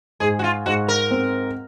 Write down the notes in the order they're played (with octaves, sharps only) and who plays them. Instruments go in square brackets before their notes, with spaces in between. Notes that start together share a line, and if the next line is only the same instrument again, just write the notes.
[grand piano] G#2 [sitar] G#4
[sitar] F#4
F4
[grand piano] G#2 [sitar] F#4
[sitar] A#4
[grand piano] C4